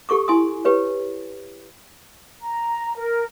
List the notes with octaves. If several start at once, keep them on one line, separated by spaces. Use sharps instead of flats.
G4 A4 C#6 D6
E4 G#5 C6 D#6
G4 B4 C#5
A#5
A#4